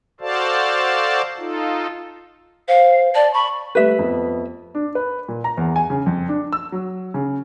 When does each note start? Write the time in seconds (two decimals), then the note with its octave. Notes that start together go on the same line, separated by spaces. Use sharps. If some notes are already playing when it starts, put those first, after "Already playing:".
0.20 F#4 A4 C5 D5 F5 A5
1.38 D#4 F4 A4
2.68 C5 F5
3.15 D5 A5
3.34 B5 C#6
3.75 G3 A3 B4 E5
3.99 F2 B3
4.75 D4
4.95 B4
5.28 A#2
5.44 A#5
5.57 E2
5.76 G#5
5.90 C#3
6.06 F2
6.29 D4
6.53 E6
6.72 F#3
7.14 C#3